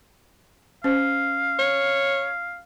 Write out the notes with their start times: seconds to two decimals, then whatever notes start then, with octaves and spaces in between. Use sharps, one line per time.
0.84 C#4 C5 F5
1.59 C#5